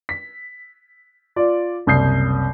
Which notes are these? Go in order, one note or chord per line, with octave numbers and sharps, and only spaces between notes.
B6
F4 D5
F#1 C2 D#6 G6 C7